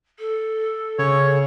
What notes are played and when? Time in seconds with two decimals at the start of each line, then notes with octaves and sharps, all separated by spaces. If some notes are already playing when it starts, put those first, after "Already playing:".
0.19 A4
0.99 C#3 C#5